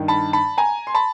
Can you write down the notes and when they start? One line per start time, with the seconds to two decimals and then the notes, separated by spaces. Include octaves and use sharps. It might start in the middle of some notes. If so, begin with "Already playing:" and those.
Already playing: G2 D#3
0.08 A5 B5
0.33 A5 B5
0.58 G#5 A#5
0.87 C6
0.94 A5 B5